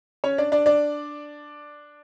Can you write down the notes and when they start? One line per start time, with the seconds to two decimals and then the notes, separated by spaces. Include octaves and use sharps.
0.24 C#4 C#5
0.38 D4 D5
0.52 D4 D5
0.66 D4 D5